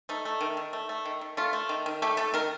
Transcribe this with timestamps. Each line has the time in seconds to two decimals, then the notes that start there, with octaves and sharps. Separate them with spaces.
0.09 A3 D#4
0.25 A3
0.41 D#3
0.57 D#3
0.73 A3
0.89 A3
1.06 D#3
1.21 D#3
1.37 A3 F4
1.53 A3
1.69 D#3
1.86 D#3
2.02 A3 G4
2.17 A3 A4
2.34 D#3 A#4